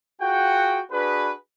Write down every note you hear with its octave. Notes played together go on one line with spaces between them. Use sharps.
F4 F#4 G#4 F#5 G5
D4 F#4 G#4 B4